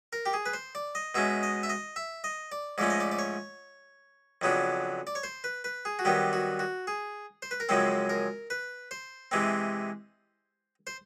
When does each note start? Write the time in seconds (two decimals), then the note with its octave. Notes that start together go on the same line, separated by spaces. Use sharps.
0.13 A#4
0.26 G4
0.33 G#4
0.46 B4
0.53 C5
0.75 D5
0.95 D#5
1.15 B2 G#3 C#4 E5
1.43 D#5
1.63 E5
1.69 D#5
1.96 E5
2.24 D#5
2.52 D5
2.78 G#2 F3 A3 C#4 D5
2.90 D#5
3.00 D5
3.11 D5
3.19 C#5
4.41 F2 C#3 F#3 B3 D4
5.07 D5
5.15 C#5
5.23 C5
5.44 B4
5.64 B4
5.85 G#4
5.99 F#4
6.05 G2 D#3 F#3 B3 G4
6.33 F#4
6.59 F#4
6.87 G#4
7.42 C5
7.51 B4
7.60 A#4
7.69 F#2 C#3 F3 G#3 C4 A4
8.09 A#4
8.50 B4
8.91 C5
9.31 C3 E3 G#3 C4
10.87 C5